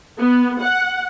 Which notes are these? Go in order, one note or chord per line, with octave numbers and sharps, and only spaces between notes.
B3
F#5